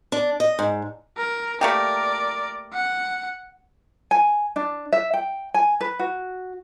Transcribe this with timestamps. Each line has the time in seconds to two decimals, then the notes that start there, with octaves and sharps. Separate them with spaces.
0.12 D4
0.40 D#5
0.59 G#2
1.17 A#4
1.61 A3 A#3 G4 A#4 D5
2.73 F#5
4.11 G#5
4.56 D4
4.92 E5
5.14 G5
5.54 G#5
5.81 B4
5.99 F#4